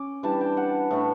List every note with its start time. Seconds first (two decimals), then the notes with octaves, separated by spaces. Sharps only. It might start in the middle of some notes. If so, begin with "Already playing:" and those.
Already playing: C#4 D6
0.23 E3 G3 D4 A5
0.41 G5
0.57 F#5
0.91 A2 E3 A3 D4